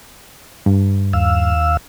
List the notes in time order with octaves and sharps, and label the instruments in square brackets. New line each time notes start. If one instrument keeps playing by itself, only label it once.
[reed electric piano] G2
[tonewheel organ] D#2 F5 E6